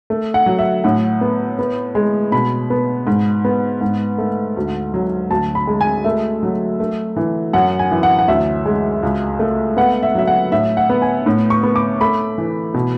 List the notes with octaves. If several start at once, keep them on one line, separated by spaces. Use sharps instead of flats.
A3
F#5
F#3
E5
A2 F#5
B3
B3
G#3
B2 B5
B3
G#2
B3
G#2
A3
D2
F#3
D2 A5
B5
G#3
G#5
A3 E5
F#3
A3
E3
F#2 F#5
G#5
E3
F#5
F#5
D2 E5
G#3
C#2
A3
B3 F#5
E5
F#3 E5
F#5
A2 E5
F#5
B3
G#5
A2
C#6
B3
D6
A3 B5
E3
B2